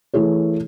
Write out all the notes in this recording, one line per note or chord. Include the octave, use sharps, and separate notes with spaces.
E3 A3 E4 G#4 C#5